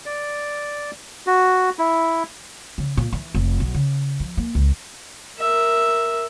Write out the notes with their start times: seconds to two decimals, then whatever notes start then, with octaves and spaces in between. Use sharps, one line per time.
0.06 D5
1.27 F#4
1.79 E4
2.78 C#3
2.97 A#2
3.13 E3
3.35 F1
3.60 B1
3.74 C#3
4.20 F3
4.37 A#3
4.55 C#2
5.39 A#4 E5